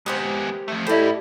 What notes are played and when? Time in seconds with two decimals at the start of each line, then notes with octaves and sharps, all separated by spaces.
0.06 G#3 B3 G4 A#4 C5
0.68 F3 A3
0.87 G3 A3 E4 G4 C5 D#5